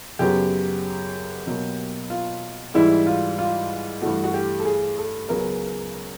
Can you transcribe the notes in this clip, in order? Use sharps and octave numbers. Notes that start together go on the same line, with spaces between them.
F#2 C#3 F#3 B3 G4
B2 F#3 A#3
F4
G#2 E3 G3 E4
F4
F4
G2 E3 A3 F#4
F#4
G4
A4
G#4
A4
C#2 C#3 F#3 B3 A#4